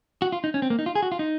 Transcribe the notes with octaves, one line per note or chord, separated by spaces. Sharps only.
F#4
F4
D#4
C#4
C4
A#3
D#4
F4
G#4
F#4
F4
D#4